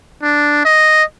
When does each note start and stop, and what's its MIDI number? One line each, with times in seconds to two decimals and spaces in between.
0.23 0.61 62
0.65 1.03 75